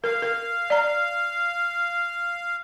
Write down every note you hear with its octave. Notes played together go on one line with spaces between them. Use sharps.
A#4 F5
A#4
D5 A#5